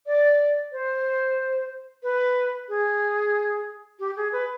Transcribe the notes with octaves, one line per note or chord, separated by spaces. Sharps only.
D5
C5
B4
G#4
G4
G#4
B4